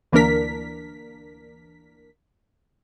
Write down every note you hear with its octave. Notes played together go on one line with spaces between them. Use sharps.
D2 E3 A#3 D4 A#4 B6